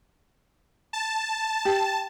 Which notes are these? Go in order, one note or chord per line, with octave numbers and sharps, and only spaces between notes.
A5
G4